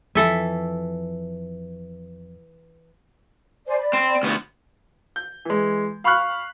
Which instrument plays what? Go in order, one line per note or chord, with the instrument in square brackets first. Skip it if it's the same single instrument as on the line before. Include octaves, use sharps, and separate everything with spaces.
[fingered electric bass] F2 [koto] E3 A4 E5
[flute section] C5 D5 G#5
D5 B5
[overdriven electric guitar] C4
D2 B3
[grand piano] G6
E3 G#3
F5 B5 C#6 F6 F#6